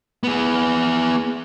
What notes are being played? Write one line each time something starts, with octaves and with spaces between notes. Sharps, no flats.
B3 G#4